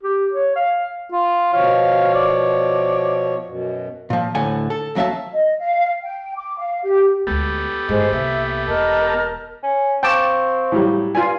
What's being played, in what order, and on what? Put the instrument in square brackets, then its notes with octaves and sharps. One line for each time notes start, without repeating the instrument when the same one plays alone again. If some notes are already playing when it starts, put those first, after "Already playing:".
[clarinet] G4
C#5
F5
[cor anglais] F4
[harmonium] B2 F3 C#5 [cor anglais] F5
[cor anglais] D5
[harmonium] F#2 B2
[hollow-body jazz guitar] A#2 F3
D2 A2 D3 F#5 G#5
A4
D#2 F#3 C#4 E5 F5 A5
[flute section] D#5
F5
G5
D6
F5
G4
[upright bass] D2 G#3 [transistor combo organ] B3 G4 A4
[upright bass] G1 G#2 [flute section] G#4 C5 D#5
[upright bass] C2 A#3 [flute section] E5
[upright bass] E1 [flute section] A#4 D#5 A5
[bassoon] C#4
[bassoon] C4 [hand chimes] F5 C#6 G6 [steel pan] G5 A5 D6
[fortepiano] A2 F#3 G3
[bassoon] G2 [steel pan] F4 G#5